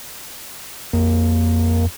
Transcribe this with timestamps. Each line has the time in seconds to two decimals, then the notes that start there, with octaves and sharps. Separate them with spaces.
0.93 F2 A#3